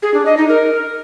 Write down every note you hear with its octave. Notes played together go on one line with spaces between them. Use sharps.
G#4
D4
D#5
D#4
A#4